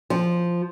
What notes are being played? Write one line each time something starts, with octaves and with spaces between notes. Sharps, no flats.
F3